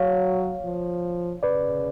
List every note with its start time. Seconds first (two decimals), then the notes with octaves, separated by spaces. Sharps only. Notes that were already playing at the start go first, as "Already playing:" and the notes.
Already playing: F#3 C#5 F5
0.64 F3
1.43 C#3 B4 D5